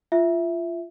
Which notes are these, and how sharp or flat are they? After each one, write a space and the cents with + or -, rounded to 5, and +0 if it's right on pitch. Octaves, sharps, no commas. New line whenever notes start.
F4 -20 E5 +0